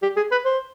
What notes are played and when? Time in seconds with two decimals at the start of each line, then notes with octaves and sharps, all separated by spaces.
0.03 G4
0.17 G#4
0.31 B4
0.45 C5